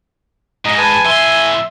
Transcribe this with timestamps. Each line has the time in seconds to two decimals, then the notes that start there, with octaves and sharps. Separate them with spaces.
0.65 G#2 G#3 D#5 A#5
0.78 B4 G#5 A5
1.05 A2 E5 C6